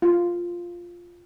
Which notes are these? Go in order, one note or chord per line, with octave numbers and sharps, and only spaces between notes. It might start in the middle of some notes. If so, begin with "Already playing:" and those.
F4